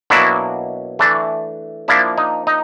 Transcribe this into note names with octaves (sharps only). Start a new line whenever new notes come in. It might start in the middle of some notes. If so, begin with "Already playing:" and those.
B2 F#3 A#3 D4 E4 F#4
E3 A3 D4
F3 A#3 D4 E4
D#4
D#4